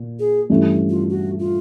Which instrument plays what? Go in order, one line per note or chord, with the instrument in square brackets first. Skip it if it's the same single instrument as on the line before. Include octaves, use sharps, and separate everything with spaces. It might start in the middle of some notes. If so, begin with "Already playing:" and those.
Already playing: [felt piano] A#2
[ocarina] G#4
[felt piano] G2 E3 A3 C#4 E4
[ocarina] F4
F#4
F4